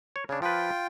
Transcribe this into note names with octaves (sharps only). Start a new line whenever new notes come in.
C#5
C#3 D4 C#5
F3 F4 B4 G5